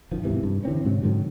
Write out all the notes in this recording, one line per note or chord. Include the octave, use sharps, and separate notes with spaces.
F#2 D#3 F3
E2 G#2 C3 E3
G2
D3 E3 C4 C#4
G#2 C3 F#3
G#2 D3 D#3 F#3